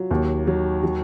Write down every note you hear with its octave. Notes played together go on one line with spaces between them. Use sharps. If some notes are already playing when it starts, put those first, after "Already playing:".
Already playing: F#3 F4
D#2
F#3
F#3